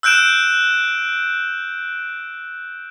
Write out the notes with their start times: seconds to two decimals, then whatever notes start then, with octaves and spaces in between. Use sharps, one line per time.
0.03 E6 F#6 G6 D7 E7